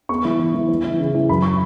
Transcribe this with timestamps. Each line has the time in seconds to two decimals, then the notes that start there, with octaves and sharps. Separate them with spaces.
0.09 B3 C#6
0.25 E3
0.39 E3
0.54 E3
0.69 E3
0.84 E3
0.99 C#3
1.14 E3
1.29 F#2 B5
1.42 C#6